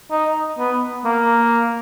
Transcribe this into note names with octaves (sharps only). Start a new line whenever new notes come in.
D#4
B3
A#3